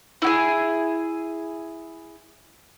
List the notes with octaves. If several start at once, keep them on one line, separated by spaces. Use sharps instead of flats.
E4 F#4 G#4